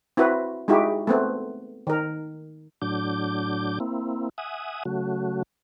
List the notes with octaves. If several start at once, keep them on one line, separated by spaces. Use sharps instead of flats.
C4 E4 F#4 B4
G#3 D#4 E4 F#4 G4
A3 B3 C4
D#3 A#4
A2 F#3 D4 D6 G6
A#3 C4 E4
E5 F#5 G#5 D#6
C#3 F#3 A3 F#4